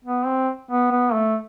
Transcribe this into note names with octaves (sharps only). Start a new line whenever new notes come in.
B3
C4
B3
B3
A3